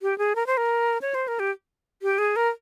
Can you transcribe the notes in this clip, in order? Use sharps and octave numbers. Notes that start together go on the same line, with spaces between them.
G4
G#4
A#4
C5
A#4
C#5
C5
A#4
G4
G4
G#4
A#4